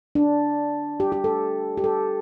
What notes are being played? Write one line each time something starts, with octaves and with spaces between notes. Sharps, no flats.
D4
G4
G4
A4
G4
A4